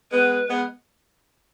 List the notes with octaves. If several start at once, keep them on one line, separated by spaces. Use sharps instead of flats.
G#3 B3 B4
G#3 B3